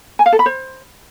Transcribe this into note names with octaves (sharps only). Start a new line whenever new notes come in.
G#5
F5
A4
B5
C5